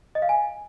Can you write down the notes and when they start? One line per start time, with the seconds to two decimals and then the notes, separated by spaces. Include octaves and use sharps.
0.15 D#5
0.22 F5
0.29 G#5